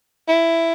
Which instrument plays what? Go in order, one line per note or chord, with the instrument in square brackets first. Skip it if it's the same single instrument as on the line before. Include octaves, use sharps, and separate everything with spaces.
[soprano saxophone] E4